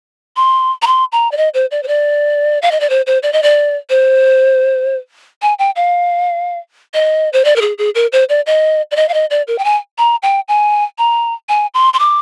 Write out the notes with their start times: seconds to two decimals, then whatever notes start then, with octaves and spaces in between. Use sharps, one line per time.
0.37 C6
0.82 A#5
0.87 C6
1.12 A#5
1.32 D5
1.37 D#5
1.54 C5
1.71 D5
1.83 C5
1.88 D5
2.62 F5
2.71 D#5
2.80 D5
2.90 C5
3.07 C5
3.23 D5
3.33 D#5
3.43 D5
3.90 C5
5.42 G#5
5.59 G5
5.76 F5
6.94 D#5
7.33 C5
7.45 D5
7.56 A#4
7.61 G#4
7.78 G#4
7.95 A#4
8.12 C5
8.29 D5
8.46 D#5
8.91 D5
8.96 D#5
9.09 F5
9.14 D#5
9.30 D5
9.47 A#4
9.58 G5
9.64 G#5
9.98 A#5
10.23 G5
10.48 G#5
10.98 A#5
11.49 G#5
11.74 C6
11.94 C6
11.99 D6